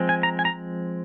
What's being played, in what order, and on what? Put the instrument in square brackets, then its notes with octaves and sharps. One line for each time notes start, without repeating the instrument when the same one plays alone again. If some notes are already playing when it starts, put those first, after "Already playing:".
Already playing: [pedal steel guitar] F3 G#3 C4
G#5
A#5
G#5
A#5